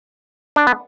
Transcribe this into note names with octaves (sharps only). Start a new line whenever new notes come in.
D4
B3